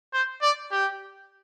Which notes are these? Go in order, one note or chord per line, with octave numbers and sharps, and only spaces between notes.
C5
D5
G4